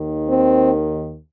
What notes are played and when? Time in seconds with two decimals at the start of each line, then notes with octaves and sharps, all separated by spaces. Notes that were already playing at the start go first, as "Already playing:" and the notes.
Already playing: D#2 D#3
0.26 C4